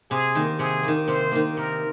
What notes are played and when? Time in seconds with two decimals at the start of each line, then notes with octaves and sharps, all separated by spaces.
0.11 C3 G#4
0.35 D#3 A#3
0.59 C3 G#4
0.83 D#3 A#3
1.08 C3 C5
1.32 D#3 A#3
1.56 C3 A#4